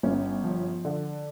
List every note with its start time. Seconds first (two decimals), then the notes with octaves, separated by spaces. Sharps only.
0.03 G1 C#4
0.44 F3
0.85 D3